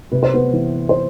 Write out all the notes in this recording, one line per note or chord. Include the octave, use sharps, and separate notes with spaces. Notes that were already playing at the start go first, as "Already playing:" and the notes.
C3 B4
C5
B3 B4
E3
C5